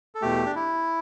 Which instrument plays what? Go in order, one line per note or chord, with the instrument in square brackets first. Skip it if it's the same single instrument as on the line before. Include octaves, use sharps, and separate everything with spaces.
[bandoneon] A4
E2 B2 A3 G4
D4
E4